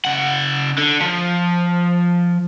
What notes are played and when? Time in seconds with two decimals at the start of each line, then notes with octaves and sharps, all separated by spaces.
0.05 C#3 F#5
0.78 D3
1.00 F3